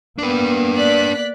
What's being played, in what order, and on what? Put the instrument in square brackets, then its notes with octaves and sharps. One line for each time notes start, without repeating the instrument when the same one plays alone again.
[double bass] A#3 B3 [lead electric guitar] D4 B4
[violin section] D5 F#6 B6